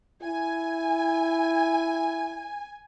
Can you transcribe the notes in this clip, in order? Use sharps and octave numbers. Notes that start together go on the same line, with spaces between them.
E4 G#5